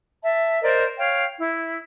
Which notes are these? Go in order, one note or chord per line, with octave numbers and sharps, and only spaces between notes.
E5 A5
A#4 C5 D5 D#5
C#5 F5 G5
E4